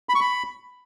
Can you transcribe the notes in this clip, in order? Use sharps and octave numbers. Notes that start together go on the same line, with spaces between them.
B5
C#6
B5